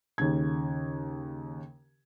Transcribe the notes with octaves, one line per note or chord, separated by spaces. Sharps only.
D#2 C#3 G#6